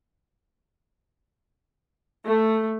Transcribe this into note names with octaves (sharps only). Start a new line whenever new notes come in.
A3